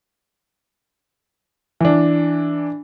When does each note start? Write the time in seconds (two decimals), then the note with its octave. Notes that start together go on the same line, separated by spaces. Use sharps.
1.81 E3 D4